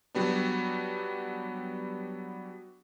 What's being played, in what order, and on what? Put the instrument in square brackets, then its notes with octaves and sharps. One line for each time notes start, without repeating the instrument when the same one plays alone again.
[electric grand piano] F#3 G3 B3 D4